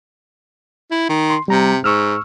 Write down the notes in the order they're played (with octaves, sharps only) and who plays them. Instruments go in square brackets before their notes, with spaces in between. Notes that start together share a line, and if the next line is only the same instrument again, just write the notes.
[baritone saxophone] E4
D#3
[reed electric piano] C6
[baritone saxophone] C3 [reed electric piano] G3 A#5
[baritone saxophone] G#2 [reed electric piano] C#6 E6 F6